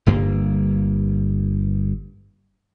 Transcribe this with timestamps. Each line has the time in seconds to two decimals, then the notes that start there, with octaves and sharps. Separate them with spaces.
0.06 G1 G2 A#3